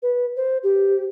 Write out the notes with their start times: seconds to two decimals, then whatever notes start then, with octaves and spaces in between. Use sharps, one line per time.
0.03 B4
0.36 C5
0.63 G4